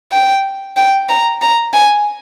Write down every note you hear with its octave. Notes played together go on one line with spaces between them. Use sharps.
G5
G5
A#5
A#5
G#5